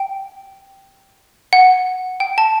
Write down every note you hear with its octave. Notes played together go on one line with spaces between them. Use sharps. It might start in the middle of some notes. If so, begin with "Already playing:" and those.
Already playing: G5
F#5
G5
A5